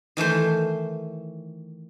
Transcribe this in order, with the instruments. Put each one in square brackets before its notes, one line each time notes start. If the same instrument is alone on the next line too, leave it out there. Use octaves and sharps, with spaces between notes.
[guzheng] D#3 E3 A3 C5